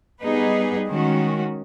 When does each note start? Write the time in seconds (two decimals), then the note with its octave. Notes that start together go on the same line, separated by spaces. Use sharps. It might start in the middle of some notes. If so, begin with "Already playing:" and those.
0.22 G3 B3 D#4 G#4 B4
0.88 D#3 G#3 C#4 F#4